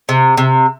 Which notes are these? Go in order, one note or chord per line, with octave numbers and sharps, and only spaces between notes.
C3
C3